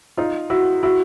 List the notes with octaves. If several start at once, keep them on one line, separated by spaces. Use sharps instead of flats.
D#4 F4
E4 F#4
E4 F#4